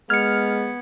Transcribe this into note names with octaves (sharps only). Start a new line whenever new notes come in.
G#3 B3 F6 G#6 C#7